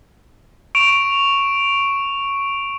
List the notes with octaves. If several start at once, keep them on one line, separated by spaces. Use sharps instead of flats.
C#6 D7 E7 F7